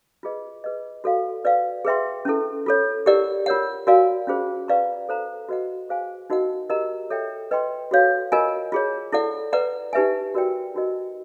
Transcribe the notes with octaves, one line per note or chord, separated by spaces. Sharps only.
F4 G#4 B4 D#5
G#4 B4 D#5
F#4 A4 D5 F5
B4 D5 F5
G#4 B4 E5 G5 C6
C#4 E4 A4
F4 A4 C#5
E4 G4 A#4 D5 F#5
F4 A#4 C#5 F#5
F#4 A#4 D5 F5 G#5
C#4 F4 G#4 C5
B4 D5 F5 A#5 C#6
A4 C5 F5 A#5
F#4 B4 D#5 F#5
G#4 C5 F5 G#5
D#4 F#4 A#4 D#5 F#5
G4 A#4 D#5 F#5 A#5
A4 C#5 E5 G5
B4 D#5 G5 C6
F#4 A4 C#5 F5
F4 A#4 D#5 G#5
F4 G#4 C#5
E4 A4 D5 F#5
B4 D5 F#5 A#5
D#4 G4 B4 E5 G#5
F#4 A#4 D5 G5
D#4 F#4 A#4 D#5